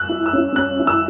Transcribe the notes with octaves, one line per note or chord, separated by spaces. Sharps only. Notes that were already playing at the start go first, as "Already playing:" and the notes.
Already playing: E6 F#6
E4
E6
C#4
C#4 F#6
E4
E6